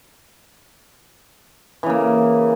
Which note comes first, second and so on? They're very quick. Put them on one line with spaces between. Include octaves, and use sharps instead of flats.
E3 C#3 A#3